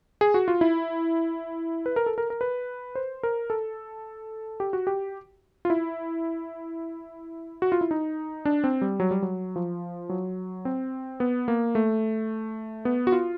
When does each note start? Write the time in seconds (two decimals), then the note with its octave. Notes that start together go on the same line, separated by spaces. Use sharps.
0.21 G#4
0.34 F#4
0.48 F4
0.61 E4
1.86 B4
1.96 A#4
2.06 A4
2.18 A#4
2.30 A#4
2.41 B4
2.95 C5
3.23 A#4
3.50 A4
4.60 G4
4.73 F#4
4.87 G4
5.65 F4
5.70 E4
7.62 F#4
7.72 F4
7.81 E4
7.91 D#4
8.45 D4
8.64 C4
8.81 G3
9.00 F#3
9.11 G3
9.22 F#3
9.56 F3
10.09 F#3
10.65 C4
11.20 B3
11.48 A#3
11.75 A3
12.85 B3
13.07 F#4
13.12 F4